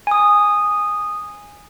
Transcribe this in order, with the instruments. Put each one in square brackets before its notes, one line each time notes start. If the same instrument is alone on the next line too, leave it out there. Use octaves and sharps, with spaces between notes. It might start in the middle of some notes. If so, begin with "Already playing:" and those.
[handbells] G#5 D#6